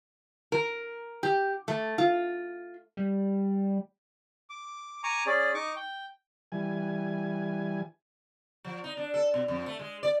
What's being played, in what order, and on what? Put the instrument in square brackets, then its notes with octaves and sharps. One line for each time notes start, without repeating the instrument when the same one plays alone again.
[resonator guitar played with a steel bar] A#4
G4
A3
F4
[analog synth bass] G3
[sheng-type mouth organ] D6
G#5 A#5 C#6 D6
C#4 G#4 D5
D#4 C#6 D6
G5
[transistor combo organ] E3 G3 G#5
[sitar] F3
D#4
D4
A4
B2
F2
A3
G#3
D5